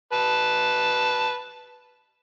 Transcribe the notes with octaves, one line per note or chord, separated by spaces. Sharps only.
B4 A5